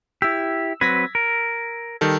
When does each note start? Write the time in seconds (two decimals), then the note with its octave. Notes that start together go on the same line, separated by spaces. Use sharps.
0.22 E4 G4 E6
0.81 F#3 C4 B4 G#6 A#6 B6
1.15 A#4
2.01 D#3 G3 A4